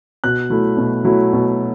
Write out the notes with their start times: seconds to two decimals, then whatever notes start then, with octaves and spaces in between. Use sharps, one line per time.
0.24 B2 F#6
0.50 F#3 A3 E4
0.77 B2
1.05 F#3 A3 E4
1.33 B2